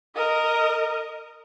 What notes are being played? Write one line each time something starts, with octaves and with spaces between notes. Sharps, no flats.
A#4 D#5